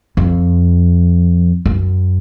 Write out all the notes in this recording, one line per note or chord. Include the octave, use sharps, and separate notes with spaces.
F2
F#2